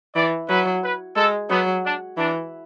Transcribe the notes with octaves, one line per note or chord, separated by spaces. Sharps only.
E3 D5
F#3 B4
B4
G#3 A4
F#3 B3
D4
E3 D4